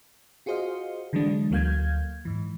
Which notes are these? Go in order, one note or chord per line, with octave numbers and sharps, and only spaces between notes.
F4 F#4 G#4 C5 D#5 F5
D3 E3 F#3 G#3 D4
D2 F#3 A#3 F5 G6 G#6
G#2 E3